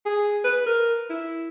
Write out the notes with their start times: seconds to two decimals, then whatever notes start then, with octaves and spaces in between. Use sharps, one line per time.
0.06 G#4
0.44 B4
0.66 A#4
1.10 E4